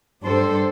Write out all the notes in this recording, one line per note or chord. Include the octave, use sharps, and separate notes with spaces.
G2 G3 D4 A4 C5